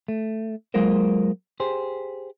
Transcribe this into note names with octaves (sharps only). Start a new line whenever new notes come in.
A3
F#3 G#3 A#3 F4 A#4 C5
G4 G#4 C5